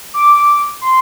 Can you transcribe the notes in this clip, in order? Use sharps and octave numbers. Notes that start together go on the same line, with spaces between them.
D6
C6